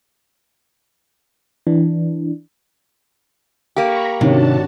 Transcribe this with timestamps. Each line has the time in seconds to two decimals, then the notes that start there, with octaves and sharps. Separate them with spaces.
1.67 E3 D4
3.76 A#3 G4 A#5 B5 C#6
4.21 G#1 C3 D#3 C#4 D4 F#4 A5